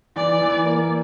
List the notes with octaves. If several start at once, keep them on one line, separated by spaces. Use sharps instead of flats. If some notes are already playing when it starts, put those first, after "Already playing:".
E3 D5
E3
A#3